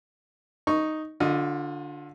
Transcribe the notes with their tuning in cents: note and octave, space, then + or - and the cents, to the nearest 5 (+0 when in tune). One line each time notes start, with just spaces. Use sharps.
D#4 +0 C#6 +0
D3 +0 F4 +30 D#5 +0